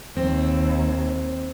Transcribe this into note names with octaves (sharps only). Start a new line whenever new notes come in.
D#2 C4